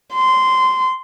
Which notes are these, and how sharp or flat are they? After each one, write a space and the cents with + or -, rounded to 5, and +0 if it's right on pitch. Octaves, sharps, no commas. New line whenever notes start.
C6 -15